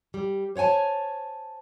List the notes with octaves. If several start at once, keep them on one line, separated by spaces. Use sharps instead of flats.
G3
C5 C#5 F#5 G#5 A5